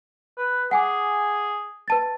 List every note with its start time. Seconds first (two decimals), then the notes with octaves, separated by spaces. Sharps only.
0.37 B4
0.71 G#4 F#5 G#5 D6
1.88 B4 A5 A6